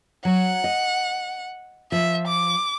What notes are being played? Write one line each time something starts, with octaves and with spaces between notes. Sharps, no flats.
F#3 F#5
D#5
F3 E5
D6